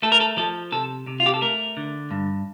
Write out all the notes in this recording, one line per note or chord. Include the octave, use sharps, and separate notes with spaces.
A3 A4
A#4
A4
F3 A4
C3 A4
C3
F4
G4
A4
A3 A#4
D3
G2